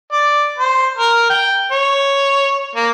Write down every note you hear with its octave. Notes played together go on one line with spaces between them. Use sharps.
D5
C5
A#4
G5
C#5
A#3